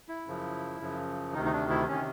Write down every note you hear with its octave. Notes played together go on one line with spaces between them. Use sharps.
E4
F#2 C#3 F3
F#2 C#3 F3
D2 C3 D#3 D#4
D#4
D4
E4
C3 D#3 C#4